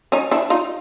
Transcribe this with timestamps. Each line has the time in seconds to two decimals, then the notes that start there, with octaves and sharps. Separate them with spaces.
0.12 C#4 D#4
0.31 D4 E4
0.50 D#4 F4